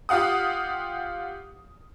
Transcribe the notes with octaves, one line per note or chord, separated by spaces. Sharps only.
F4 G4 F5 F#5 D#6